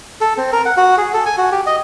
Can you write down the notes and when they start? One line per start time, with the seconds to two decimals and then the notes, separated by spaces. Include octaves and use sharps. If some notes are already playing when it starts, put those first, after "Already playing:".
0.21 A4
0.37 C4
0.52 A#4
0.65 F#5
0.77 F#4
0.98 G#4
1.14 A4
1.26 G#5
1.38 F#4
1.52 G4
1.67 D#5